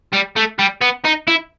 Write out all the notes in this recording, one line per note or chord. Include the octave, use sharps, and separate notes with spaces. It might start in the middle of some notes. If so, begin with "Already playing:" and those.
G3
A3
G3
B3
D#4
E4